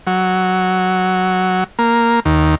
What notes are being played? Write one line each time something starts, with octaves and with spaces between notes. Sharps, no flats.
F#3
A#3
D#2